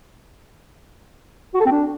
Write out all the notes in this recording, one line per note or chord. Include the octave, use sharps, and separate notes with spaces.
F#4
A4
C4
D4